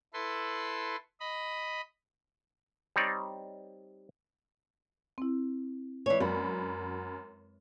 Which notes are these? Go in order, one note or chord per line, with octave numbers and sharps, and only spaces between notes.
E4 A4 B4 C6
D#5 B5
G3 C4 D#4 C#5 D5
C4 E4
E3 G#3 C#5 D5
F#2 F#4 B5